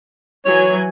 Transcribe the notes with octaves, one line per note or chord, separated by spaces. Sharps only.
E3 F#3 C#5 G#5